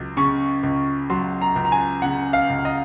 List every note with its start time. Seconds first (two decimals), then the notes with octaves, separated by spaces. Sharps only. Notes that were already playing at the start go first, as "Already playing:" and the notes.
Already playing: C#2 F#3
0.17 C#3 C#6
0.63 C#2
1.10 F#3 C6
1.41 A#5
1.56 C#2
1.65 A#5
1.72 G#5
2.02 C#3 F#5
2.33 F5
2.50 C#2
2.65 D#5